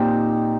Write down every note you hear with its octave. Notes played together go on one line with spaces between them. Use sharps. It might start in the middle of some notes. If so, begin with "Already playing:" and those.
Already playing: A#2 C4 D#4 G4 C5